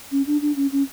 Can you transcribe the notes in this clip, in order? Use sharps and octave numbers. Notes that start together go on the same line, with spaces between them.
C#4
D4
D4
C#4
C#4